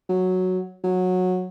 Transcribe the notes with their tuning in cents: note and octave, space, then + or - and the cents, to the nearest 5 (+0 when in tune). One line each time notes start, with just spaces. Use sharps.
F#3 -5
F#3 -15